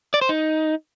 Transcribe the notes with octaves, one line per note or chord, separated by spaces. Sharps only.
D5
C5
D#4